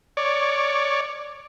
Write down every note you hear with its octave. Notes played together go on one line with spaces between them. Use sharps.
C#5 D5